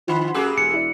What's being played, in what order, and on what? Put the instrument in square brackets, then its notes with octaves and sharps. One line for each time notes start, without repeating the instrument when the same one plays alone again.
[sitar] D3 [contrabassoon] F3 [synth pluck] F#5 B5 C6
[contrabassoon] F#2 [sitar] A3 G4 G#4 [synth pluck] D6 E6 F#6
[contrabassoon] E1 [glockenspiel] C#7
[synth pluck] E4 D5